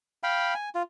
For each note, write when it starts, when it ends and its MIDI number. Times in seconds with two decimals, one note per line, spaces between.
0.23 0.54 77
0.23 0.54 79
0.23 0.54 83
0.54 0.69 80
0.75 0.82 65